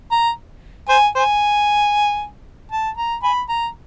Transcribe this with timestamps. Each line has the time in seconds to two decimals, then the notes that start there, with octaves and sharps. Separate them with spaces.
0.11 A#5
0.89 C5 G#5
1.15 C5 G#5
2.72 A5
2.97 A#5
3.23 G#5 B5
3.49 A#5